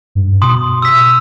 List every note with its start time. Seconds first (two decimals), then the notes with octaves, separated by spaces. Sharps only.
0.15 G2
0.42 B2 C6 D#6
0.82 E6 B6